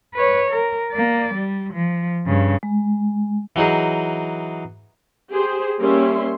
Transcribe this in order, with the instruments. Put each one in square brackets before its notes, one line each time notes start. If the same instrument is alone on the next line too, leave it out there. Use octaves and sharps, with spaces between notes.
[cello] B4 C#5
A#4
A#3 D5
G3
F3
G2 C#3
[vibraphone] G#3
[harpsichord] E3 F#3 D#4 G#4
[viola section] G4 G#4 C5
G3 A#3 C#4 E5 C6